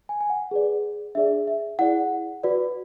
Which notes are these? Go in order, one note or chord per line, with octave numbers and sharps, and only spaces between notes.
G#5
G#5
F#5
G#4 B4 D5
D4 G#4 D5 E5
E5
E4 G#4 D5 F#5
F#4 B4 D5